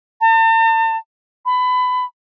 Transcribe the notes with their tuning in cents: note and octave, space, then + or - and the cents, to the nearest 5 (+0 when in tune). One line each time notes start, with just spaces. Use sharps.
A5 +40
B5 +25